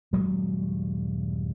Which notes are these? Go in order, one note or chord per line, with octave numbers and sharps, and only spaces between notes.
D#1 G2 F#3 G#3